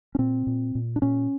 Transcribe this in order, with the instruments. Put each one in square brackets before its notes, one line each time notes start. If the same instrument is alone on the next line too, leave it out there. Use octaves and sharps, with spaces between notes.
[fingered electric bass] C#4
A#2 C4
A#2
A#2
D4
A#2 C#4